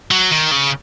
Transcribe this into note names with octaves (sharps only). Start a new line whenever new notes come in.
F#3
D#3
C#3